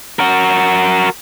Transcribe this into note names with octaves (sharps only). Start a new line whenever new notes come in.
F#4 A#4